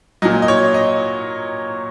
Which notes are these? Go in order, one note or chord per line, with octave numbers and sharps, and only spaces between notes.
A#2 F#3 D#5
D#5
C#5
D#5